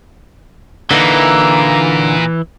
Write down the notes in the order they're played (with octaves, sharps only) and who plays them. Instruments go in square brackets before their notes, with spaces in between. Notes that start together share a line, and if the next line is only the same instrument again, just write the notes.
[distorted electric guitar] A#2 [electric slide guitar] D3 D#4 [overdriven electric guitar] E3 [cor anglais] A#3